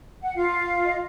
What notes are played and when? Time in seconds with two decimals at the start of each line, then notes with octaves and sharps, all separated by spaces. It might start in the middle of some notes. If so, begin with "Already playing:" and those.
0.22 F#5
0.36 F4 F5
0.85 D#5